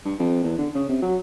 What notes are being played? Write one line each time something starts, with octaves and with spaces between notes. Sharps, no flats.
G2
F2
E2
D3
C#3
C3
F#3